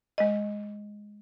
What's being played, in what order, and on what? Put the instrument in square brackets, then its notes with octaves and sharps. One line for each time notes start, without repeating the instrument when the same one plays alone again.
[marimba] G#3 D#5